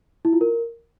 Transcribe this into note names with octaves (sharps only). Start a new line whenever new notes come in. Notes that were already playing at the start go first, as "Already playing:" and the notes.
E4
F4
A#4